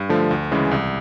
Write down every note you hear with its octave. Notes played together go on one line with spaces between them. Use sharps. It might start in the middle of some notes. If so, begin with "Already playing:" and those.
Already playing: G2
D3 F3 A3
D2
C#3 E3 G#3
C2